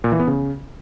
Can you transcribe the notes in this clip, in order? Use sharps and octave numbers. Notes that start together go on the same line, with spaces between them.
A#2
E3
B3
C#3